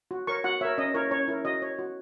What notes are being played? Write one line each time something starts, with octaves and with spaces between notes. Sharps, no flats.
F#4
A#4 C#5 C#6
F#4 F#5
A#4 C#5 E5
C#4 D#5
E4 A#4 C#5
C#4 C#5
E4 A#4
F#4 D#5
C#5
F#4